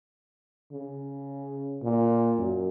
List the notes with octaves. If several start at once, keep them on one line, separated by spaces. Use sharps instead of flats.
C#3
A#2
F#2